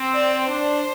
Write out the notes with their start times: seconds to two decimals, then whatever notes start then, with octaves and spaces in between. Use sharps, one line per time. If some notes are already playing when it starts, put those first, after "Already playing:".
Already playing: C4
0.14 D5
0.47 D4 C5